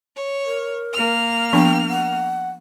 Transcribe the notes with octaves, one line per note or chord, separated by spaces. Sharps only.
C#5
A#4
A#3 F6
F3 B3 D4 G5
F#5